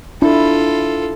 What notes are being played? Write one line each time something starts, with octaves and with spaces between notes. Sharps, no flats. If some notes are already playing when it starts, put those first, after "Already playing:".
D4 E4 F4 A4